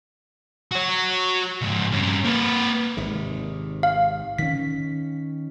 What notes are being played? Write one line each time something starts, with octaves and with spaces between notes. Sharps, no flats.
F#4 C#5
C#2 G#2
G2 C#4
A#3 B4
G#1 C3 D#3
F5
D#3 C#4 B6